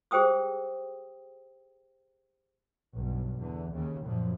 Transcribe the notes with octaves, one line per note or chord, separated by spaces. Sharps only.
G4 G#4 C5 G5 D#6 E6
B1 G2
E2 D3
D#2 C#3
F#2 A#2 F3